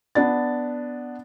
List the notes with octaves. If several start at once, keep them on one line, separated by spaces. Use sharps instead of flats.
B3 D4 A6